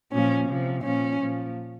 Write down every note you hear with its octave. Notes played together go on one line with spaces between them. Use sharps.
A#2 F3 C#4
C3 F3
A#2 F3 C#4
A#2 F3